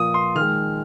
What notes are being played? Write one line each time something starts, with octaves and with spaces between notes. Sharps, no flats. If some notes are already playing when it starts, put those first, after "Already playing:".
Already playing: A#2 F3 A#3 D#6
C6
D#3 G#3 F6